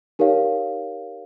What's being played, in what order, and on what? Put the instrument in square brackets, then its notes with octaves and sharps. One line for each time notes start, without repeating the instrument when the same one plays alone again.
[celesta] D#4 G4 A#4 C#5 F5